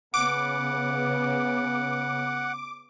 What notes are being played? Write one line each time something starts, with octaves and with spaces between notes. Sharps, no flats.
C#3 B3 F#5 D6